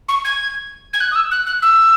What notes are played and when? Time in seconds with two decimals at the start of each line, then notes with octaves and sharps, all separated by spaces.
0.08 C#6
0.24 G#6
0.93 G#6
1.00 F#6
1.11 D#6
1.15 E6
1.31 F#6
1.46 F#6
1.62 E6